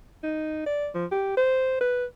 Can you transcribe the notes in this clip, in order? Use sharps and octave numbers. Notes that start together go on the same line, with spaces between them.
D#4
D5
F3
G4
C5
B4